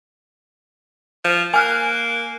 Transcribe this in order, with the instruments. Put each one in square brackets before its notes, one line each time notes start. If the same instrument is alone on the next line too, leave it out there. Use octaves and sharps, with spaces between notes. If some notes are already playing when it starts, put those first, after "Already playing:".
[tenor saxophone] F3
[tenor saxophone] A#3 [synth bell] G#5 F6 F#6